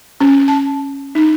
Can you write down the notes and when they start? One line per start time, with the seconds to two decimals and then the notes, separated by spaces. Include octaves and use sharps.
0.20 C#4
0.48 A5
1.15 D#4